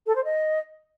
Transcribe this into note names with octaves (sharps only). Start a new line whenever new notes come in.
A4
C5
D#5